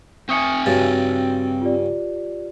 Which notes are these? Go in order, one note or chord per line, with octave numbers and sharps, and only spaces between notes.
C4 E5 G#5 C#6 D#6 C#7
G2 C#3 F#4 A6
F4 G4 D5